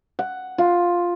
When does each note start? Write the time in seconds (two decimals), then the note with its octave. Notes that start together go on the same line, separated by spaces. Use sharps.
0.19 F#5
0.58 F4